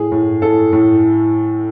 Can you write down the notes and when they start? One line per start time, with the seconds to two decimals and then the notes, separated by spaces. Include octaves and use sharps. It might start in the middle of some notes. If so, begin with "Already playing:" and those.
Already playing: A2 G#4
0.12 A2
0.42 A2 A4
0.73 A2